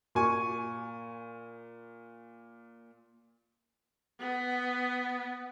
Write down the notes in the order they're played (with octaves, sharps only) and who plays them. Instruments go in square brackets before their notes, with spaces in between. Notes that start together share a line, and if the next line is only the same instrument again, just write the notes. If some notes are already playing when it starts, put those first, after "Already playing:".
[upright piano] A#2 G#5 C#6
[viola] B3